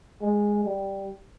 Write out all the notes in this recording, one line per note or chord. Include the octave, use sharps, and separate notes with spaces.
G#3
G3